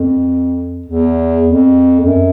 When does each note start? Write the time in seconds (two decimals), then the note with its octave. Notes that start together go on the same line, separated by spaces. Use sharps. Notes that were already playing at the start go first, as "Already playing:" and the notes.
Already playing: F2
0.86 E2
1.46 F2
2.00 F2
2.05 F#2